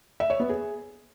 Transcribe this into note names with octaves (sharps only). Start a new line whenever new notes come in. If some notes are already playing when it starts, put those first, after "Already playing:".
E5
C#5
B3
G#4